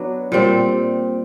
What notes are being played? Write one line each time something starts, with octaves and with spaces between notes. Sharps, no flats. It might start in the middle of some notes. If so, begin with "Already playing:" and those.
Already playing: F#3 B3 D4
A#2 G3 C4